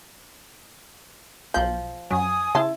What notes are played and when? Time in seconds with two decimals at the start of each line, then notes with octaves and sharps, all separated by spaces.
1.54 B1 F3 G6
2.11 F#2 F#3 G#5 D#6
2.55 C#3 E4 A5 C6